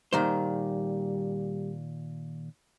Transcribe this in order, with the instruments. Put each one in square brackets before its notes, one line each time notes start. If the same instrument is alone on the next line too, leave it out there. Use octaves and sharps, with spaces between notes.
[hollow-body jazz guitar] A#2 D#3 C5 [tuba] G3